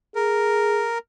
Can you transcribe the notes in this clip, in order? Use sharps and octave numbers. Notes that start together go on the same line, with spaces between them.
G#4 A#4